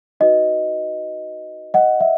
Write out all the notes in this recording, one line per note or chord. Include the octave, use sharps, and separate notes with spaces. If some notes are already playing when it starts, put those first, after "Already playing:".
D#4 F#4 B4 D#5
D#5 F#5
E5